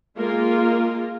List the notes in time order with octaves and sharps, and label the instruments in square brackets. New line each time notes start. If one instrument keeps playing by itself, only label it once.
[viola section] G#3 A#3 F4 A#4